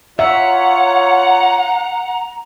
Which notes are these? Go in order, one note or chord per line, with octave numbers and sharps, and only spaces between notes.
F4 C#5 E5 F#5 A#5